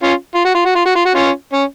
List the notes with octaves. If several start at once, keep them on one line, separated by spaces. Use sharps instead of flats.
C#4 F4
F4
F#4
F4
F#4
F4
F#4
F4
F#4
C#4 F4
C#4